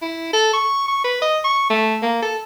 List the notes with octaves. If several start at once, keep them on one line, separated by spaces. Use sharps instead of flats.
E4
A4
C#6
C#6
B4
D#5
C#6
A3
A#3
A4